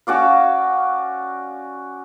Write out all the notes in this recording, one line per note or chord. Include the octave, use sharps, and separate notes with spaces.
C#4 F#4 D5 F5